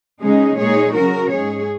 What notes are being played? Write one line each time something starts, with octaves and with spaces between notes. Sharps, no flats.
C#3 G#3 C#4 D#4 G#4
A#2 G#3 D#4 G#4 C#5
C#3 F#3 C#4 F#4 A#4
G#2 G#3 C#4 G#4 C#5